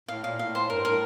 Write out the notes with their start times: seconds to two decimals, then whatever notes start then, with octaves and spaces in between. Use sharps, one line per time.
0.08 A2 F5
0.24 A#2 F5
0.39 A2 F5
0.55 C5
0.70 G2 A#4
0.85 A2 A#4